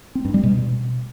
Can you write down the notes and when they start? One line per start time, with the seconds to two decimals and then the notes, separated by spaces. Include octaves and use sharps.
0.15 C4
0.25 G2
0.34 G3
0.43 B2